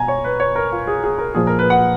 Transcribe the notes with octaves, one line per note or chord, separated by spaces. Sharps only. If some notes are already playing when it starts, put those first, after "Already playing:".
Already playing: B2 G#5 A#5
C#5
B4
C#5
A#4
F4
G#4
G#4
A#4
A#2 F3 G#4
A#4
B4
F#5